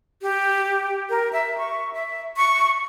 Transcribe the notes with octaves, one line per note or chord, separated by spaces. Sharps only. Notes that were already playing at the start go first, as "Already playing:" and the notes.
G4
A#4
E5
C#6
E5
C#6